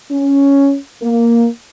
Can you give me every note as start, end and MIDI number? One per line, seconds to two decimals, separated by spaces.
0.11 0.75 61
1.02 1.46 58